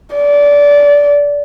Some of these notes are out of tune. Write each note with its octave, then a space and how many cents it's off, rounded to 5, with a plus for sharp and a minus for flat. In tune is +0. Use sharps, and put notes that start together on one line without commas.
D5 -20